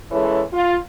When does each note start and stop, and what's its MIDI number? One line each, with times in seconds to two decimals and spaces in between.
0.11 0.42 49
0.11 0.42 52
0.11 0.42 56
0.11 0.42 64
0.11 0.42 69
0.11 0.42 73
0.53 0.77 65